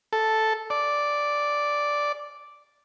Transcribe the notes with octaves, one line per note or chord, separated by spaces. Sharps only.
A4
D5